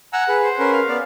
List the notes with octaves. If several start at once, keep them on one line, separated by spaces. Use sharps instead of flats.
F#5 G#5 A#5 E6
G#4 B4
C5
C#4 A#4 B4
F5
B3 D5